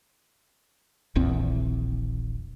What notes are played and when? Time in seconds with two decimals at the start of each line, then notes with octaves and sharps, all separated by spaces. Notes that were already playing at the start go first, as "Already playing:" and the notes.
1.15 D#1 A#1 E2 C4